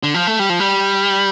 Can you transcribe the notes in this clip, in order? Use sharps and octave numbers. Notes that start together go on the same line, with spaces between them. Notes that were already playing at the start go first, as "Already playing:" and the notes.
D3
F3
A3
G3
F3
G3